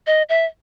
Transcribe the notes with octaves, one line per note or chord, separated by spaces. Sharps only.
D#5
E5